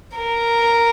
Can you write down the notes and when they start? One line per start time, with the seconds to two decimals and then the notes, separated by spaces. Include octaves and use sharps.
0.18 A#4